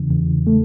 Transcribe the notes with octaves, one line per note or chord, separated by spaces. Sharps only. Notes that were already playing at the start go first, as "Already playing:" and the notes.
Already playing: E2 C#3 E3
E2
A3